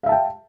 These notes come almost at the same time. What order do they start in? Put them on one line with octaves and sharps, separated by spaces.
F5 E5 A5 G5